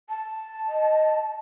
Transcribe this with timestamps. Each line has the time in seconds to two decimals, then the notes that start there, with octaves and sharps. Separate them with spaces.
0.09 A5
0.68 D#5